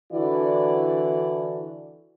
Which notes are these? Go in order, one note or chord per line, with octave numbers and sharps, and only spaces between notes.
D3 E3 D4 E4 F#4 D5